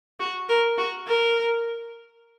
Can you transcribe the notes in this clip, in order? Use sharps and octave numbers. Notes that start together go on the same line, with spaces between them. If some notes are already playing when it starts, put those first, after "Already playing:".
F#4
A#4
F#4
A#4